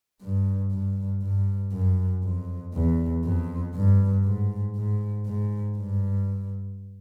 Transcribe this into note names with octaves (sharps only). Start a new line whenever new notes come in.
G2
G2
G2
F#2
F2
E2
F2
G2
G#2
G#2
G#2
G2